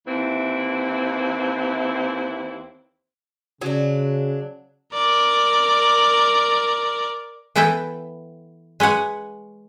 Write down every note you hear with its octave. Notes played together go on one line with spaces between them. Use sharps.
D#2 E3 C4 E4
C#3 F#3 D4
A#4 D5
E3 B3 E4 A4 B4 G5
G#3 B4 C#5 F#5 G#5